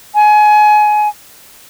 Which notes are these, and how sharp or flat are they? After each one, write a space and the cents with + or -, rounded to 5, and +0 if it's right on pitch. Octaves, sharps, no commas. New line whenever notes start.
G#5 +25